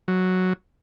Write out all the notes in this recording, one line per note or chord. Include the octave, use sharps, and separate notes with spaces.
F#3